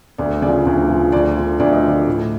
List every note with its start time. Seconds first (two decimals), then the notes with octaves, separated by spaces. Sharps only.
0.18 D2 D5
0.42 C#3 F3 D5
0.66 D2
0.89 C#3 F3
1.12 D2 D5
1.37 D3 F3
1.60 D2 D5
1.72 D#5
1.84 D3 F3 D5
2.07 A2